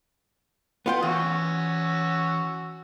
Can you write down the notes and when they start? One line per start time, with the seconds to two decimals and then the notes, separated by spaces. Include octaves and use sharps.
0.86 B3 F4 G5
1.02 E3 C#4 F#4 E6